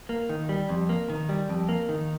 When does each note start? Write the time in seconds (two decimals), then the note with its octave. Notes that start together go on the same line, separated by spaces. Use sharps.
0.09 A#3
0.29 D#3
0.49 G3
0.69 F2
0.89 A#3
1.10 D#3
1.29 G3
1.49 F2
1.69 A#3
1.89 D#3